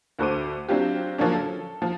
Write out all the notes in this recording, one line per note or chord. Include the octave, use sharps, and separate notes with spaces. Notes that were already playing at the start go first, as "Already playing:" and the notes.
D2 F#4 A4 C5 D6 D#7
F#3 C4 D4 F4 G4
D3 F3 F#3 A#3 C#4 D4
A4
F3